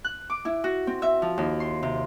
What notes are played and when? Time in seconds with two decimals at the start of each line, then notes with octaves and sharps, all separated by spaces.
0.05 F#6
0.30 D6
0.45 E4
0.64 F#4
0.87 C4
1.02 E5
1.22 F3
1.38 D#2
1.60 C6
1.83 C3